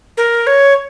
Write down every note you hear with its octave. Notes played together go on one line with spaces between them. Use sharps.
A#4
C#5